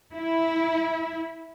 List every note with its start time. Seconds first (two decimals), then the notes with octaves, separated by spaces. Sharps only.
0.15 E4